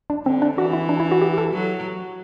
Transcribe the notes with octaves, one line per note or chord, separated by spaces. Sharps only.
D4
D3 C4
D4
E3 F#4
E4
D4
E4
F#4
G4
A4
F#3